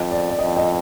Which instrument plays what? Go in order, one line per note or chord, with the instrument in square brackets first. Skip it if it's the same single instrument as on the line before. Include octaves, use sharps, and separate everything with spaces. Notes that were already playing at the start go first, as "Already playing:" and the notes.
Already playing: [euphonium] F2 [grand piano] D#5
[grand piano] D5
D5
[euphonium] F2 [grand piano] D#5
[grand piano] D#5